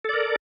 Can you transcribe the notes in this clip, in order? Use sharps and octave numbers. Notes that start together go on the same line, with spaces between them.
A4 A#4 D5